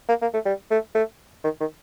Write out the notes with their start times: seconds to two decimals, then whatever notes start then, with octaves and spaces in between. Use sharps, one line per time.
0.09 A#3
0.22 A#3
0.34 A3
0.46 G3
0.71 A3
0.95 A3
1.44 D#3
1.60 D#3